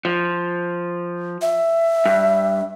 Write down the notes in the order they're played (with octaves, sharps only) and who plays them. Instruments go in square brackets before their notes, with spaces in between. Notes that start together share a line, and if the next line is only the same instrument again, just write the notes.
[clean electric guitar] F3
[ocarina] E5
[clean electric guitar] G2